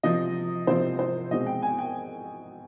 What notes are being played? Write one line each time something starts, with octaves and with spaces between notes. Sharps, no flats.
C3 F3 C4 D#5
C3 F3 C4 C5
C5
B2 G#3 C4 D#5
G5
G#5
G5